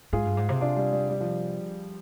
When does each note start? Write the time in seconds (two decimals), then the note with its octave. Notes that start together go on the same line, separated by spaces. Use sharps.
0.13 G#2 F4 G#4
0.25 G2
0.37 G#2
0.49 C3
0.61 D4 F4
0.76 G3
0.93 G3
1.09 G3
1.21 F3